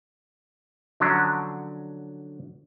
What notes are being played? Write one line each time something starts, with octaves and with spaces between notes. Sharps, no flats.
D3 F3 F#3 C#4 D4